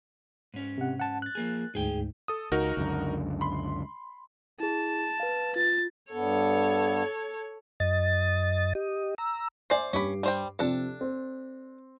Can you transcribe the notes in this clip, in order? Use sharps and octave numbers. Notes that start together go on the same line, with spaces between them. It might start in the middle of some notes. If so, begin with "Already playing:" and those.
G#2 C#4
C3 F#5
F#5 A5
F#6 A6
F3 A#3 G#4
D2 G#2 G#4 G5
A4 D#6
C#2 D#4 F#4 A#4
C#2 F#2 D3
B5 C6
E4 G#4 A5
B4 F5
F4 A6
G2 B3 A4 C#5
F#2 D#5 A6
G4 D#5
A#5 E6
C5 D5 E5 G#5 C7
G2 C#4 G4 B5 D6
G3 C5 G5
C3 F3 D4 G4 A4
C4